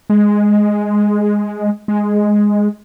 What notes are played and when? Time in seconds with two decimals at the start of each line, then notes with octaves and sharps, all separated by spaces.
0.10 G#3
1.88 G#3